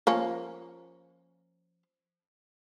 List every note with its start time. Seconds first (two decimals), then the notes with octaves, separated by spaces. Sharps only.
0.07 F3 A#3 C#4